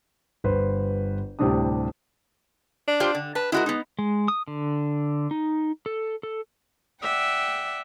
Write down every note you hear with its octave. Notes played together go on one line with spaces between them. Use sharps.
G1 B4 C5
D2 A2 C3 G3 D4 D#6
D4
F4 G4 C5
D3
B4 A5
G#3 E4 F#4 A#4
B3 D#4
G#3
D#6
D3
D#4
A4
A4
D5 E5 F#5 G5